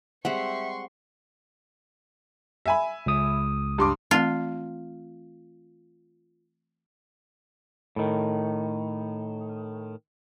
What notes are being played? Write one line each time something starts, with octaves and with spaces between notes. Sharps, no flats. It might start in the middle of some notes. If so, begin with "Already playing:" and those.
G3 G#3 C4 E5 F#5 C6 C#6
E5 G#5 B5
C#2 D#6
G2 C6 D6
E3 A3 C4 F4
A2 D#3